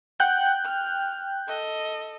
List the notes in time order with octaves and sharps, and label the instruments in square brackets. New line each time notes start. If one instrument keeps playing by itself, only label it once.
[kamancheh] F#5 [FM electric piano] G5 F#6 G6
[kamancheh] F6
A4 D#5